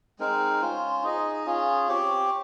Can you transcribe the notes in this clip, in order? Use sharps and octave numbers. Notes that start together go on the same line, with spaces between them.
G#3 C4 D#4 A#4
C#4 F4 C5
D#4 G#4 D#5
C#4 F4 G#4
C4 G4 C#5